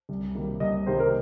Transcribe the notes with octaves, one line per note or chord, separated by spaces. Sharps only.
C2
C3 D#3 G3 A#3
C2 D#5
C3 D#3 G3 A#3 C5
A#4